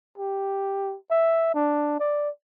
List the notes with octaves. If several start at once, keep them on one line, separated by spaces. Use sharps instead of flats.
G4
E5
D4
D5